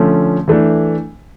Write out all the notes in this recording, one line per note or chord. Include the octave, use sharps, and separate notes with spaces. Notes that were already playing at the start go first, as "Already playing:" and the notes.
Already playing: D3 F3 A3 C#4
E3 A3 D4